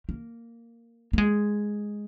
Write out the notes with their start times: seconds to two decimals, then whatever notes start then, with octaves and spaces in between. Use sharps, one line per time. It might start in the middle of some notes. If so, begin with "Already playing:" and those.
0.09 A#3
1.13 A#3
1.18 G#3